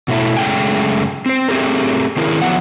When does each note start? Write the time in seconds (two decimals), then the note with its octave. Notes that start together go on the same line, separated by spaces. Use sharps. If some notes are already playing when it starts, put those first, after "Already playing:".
0.08 B2 A3 E4
0.37 F#2 C#3 G#3 A3 G5 G#5
1.26 C4 C5
1.48 A3 C4 G4 G#4 A#4
2.16 D#3 C4 E4 G#4 A#4
2.42 F3 F#3 B3 F#5